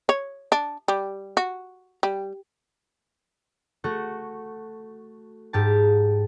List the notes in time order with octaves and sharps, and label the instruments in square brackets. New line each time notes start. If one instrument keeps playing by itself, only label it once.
[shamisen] C#5
D4
G3
F#4
G3
[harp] A3 F#4
G#2 G4 A5